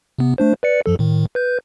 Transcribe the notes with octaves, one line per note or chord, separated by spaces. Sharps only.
C3 B3
A3 D4 C5
B4 D5 C#7
F#2 F3 A4
A2 D#3
B4 G6